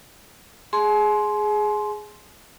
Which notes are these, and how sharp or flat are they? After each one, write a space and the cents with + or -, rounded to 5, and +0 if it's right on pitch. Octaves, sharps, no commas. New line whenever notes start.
G#4 +5 G#5 +40 C6 +0